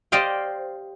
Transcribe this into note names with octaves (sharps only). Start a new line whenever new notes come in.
G4 C5 D5 D#5 F5 G5